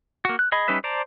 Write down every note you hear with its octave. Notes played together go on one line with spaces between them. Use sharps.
A#3 F#4
F#6
G#4 D#5 B5
G3 C#4 D#4 B4 E5
C5 D5 A5 A#5